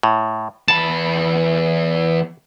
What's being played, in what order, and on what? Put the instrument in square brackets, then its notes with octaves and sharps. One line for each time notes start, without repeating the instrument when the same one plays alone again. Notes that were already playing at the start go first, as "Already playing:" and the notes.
[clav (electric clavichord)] A2
[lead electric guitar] E2 B5 [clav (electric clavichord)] A5